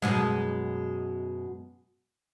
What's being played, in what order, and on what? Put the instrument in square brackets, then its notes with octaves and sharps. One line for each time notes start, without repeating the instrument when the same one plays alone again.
[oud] F#2 B2 G#3